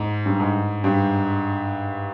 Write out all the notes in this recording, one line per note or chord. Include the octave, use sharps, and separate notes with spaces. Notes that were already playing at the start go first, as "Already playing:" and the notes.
Already playing: G#2
G2
G#2
G2